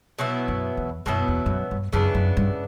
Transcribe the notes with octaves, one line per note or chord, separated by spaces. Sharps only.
B2 F#3 B3 E4
F#2
E2
F#2 B2 F#3 B3 E4
E2
G2
F#2
G2
F#2 C#3 E3 B3 D4
F#2
G2